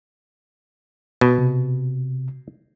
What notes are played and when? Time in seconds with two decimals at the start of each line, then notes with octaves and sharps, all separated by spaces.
1.21 B2
1.38 C3